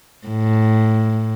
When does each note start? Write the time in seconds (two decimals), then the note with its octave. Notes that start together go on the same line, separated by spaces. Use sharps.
0.27 A2